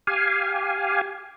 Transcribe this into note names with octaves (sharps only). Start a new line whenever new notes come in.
G4 F5 G#5